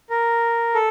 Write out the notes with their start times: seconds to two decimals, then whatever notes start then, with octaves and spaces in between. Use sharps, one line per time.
0.10 A#4
0.75 A4